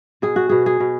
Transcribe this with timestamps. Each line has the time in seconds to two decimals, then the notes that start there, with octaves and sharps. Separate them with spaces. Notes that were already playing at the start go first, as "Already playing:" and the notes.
0.22 B2 G#4
0.36 F#4
0.49 B2 G#4
0.66 G#4
0.80 B2